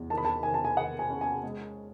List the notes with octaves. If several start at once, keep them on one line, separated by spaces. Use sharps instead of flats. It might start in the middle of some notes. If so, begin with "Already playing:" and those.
Already playing: E2
D#3 A5
B5
A5
D#3 G#5
A5
G#5
D#3 F#5
G#5
C#4
G#5
G#3